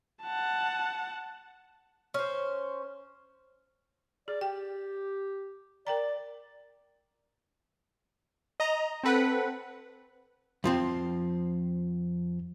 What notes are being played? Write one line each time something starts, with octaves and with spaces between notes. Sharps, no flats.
F#5 A5
C#4 C5
G#4 D5
G4 G5
A#4 D5 G5 A#5
D#5 A#5
C4 A4 B4 F#5
F2 F3 C4